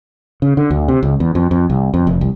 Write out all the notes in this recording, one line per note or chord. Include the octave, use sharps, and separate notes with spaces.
C#3
D3
D2
C3
C#2
E2
F2
F2
C2
F2
F1
C2